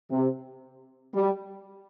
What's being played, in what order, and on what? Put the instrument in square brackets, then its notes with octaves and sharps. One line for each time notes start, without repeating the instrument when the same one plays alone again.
[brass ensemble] C3
G3